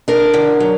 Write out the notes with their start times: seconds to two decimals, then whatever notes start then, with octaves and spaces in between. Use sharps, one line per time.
0.08 D4 A#4
0.34 D3
0.60 F#3